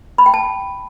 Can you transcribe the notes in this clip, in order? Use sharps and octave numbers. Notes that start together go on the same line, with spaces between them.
B5
G5
A5